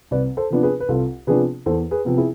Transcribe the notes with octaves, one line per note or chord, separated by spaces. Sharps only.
C2 B4 D5
A4 C5
C3 F3 B3 D4
G#4 B4
B4
C2 F4 A4
C3 F3 B3 D4 G#4 B4
E2 A4 C5
G#4 B4
C3 F3 B3
E4 G#4